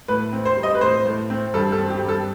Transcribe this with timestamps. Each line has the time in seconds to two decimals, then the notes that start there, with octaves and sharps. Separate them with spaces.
0.08 A2 B4
0.33 C4
0.45 C5
0.57 G3
0.63 D#5
0.75 B4
0.81 A2 C5
1.06 A2
1.30 C4
1.54 G2 A4
1.72 A4
1.78 C4
1.90 G4
2.03 G2
2.08 A4